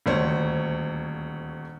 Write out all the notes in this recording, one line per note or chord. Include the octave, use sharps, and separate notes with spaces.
D#1 D2 C5 C#5